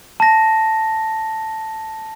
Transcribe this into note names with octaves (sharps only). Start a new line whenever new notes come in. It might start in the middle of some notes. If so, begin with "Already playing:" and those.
A5 A#6